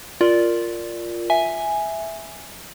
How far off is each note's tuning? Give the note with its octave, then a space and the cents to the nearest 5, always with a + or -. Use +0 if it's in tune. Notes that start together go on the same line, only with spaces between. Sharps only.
F4 +0 A#4 +0 D5 +0
E5 +0 G#5 +0